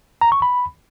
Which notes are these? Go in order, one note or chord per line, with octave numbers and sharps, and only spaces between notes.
A#5
C#6
B5